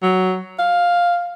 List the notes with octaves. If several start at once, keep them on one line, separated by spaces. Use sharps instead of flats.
F#3
F5